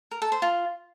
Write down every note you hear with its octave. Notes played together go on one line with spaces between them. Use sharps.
A#4
A4
C5
F4